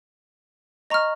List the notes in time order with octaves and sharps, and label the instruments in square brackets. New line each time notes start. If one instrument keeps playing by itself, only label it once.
[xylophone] D#5 A#5 C#6 F6